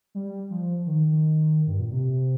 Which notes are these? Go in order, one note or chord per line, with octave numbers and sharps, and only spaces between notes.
G3
F3
D#3
G2
A#2
C3